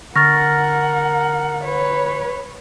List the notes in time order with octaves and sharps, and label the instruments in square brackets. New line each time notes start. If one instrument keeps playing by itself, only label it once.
[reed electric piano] D3 C#6 F6 [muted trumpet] A#4 [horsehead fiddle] F#5 [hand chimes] A6 A#6
[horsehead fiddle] B4 C#5